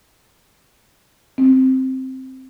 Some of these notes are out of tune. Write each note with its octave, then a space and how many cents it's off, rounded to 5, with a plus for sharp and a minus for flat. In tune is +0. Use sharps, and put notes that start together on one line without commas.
C4 +0